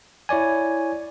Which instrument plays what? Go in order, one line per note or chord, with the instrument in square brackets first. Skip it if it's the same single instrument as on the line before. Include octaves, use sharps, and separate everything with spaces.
[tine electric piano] E4 C#5 D5 G#5